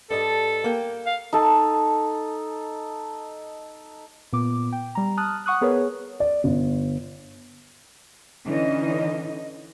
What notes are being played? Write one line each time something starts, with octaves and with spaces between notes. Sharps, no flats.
G2 A4 D#5 A5
A#3 G5
F5
D#4 A4
A#2 B3 D6
G5
G3 A#5
A5 D#6 F6 F#6
F#5 C#6 D#6 F#6
B3 G#4 A#4 B4 C#5
D5
G1
D3 E3 C#4 D#4 D#5